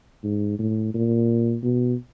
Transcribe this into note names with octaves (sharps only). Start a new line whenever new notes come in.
G#2
A2
A#2
B2